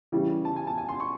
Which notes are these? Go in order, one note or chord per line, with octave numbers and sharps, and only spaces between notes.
C#3 E3 G3
A5
G#5
A5
G#5
C6
C#6